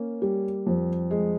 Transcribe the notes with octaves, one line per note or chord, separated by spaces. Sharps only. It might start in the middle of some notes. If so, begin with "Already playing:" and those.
Already playing: A#3 C#4
G3
F2
G#3